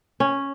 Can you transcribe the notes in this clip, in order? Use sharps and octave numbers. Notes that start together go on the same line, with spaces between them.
C#4